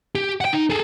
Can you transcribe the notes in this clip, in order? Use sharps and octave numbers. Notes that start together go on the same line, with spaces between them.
G4
F#5 G5
D#4
G#4 A4